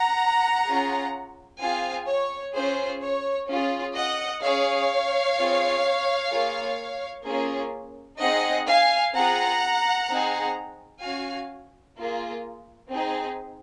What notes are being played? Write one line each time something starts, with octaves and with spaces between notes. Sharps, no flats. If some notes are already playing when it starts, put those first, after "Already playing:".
Already playing: F#5 A#5
C#4 F4 G#4
C4 F4 G#4 F5 G#5
C#5
C#4 F4 G#4 C5
C#5
C#4 F4 G#4
D#5 F#5
C#4 G#4 C#5 F5
C4 F4 G#4
A#3 F4 G#4
A#3 C#4 F4 G#4
C4 D#4 G#4 D#5 F#5
F5 G#5
C4 F4 G#4 F#5 A#5
C4 D#4 G#4
C#4 F#4 F5 G#5
A#3 F4 G#4
C4 D#4 G#4